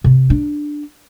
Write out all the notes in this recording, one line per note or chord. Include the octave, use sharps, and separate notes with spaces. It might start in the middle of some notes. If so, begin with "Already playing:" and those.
C3
D4